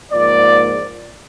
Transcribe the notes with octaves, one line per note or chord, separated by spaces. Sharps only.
G#2 F3 A#3 D5